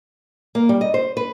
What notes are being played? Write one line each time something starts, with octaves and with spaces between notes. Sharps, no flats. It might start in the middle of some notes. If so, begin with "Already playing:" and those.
A#3
G3
D#5
C5
B4